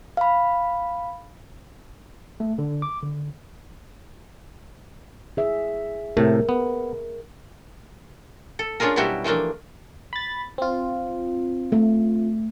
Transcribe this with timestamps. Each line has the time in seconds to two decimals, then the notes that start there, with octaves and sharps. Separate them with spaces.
0.17 F5 B5
2.40 A3
2.58 D3
2.82 D6
3.03 D3
5.37 G#4 E5
6.17 A2 C3 A3 A#4
6.49 B3
8.59 A4
8.80 C#4 D4 F4 G#4 A#4
8.96 B2 F#3 G3 E4 F#4 G4
9.24 E3 F3 A3 A#3 D4
10.13 B5 A6
10.58 C4 F4
11.72 A3